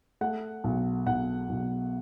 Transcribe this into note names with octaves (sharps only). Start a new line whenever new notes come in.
A3 F#5
B1
B1 F#5
B1